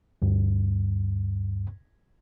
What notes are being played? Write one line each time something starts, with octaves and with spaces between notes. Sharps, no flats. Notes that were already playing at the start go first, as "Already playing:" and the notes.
D2 G2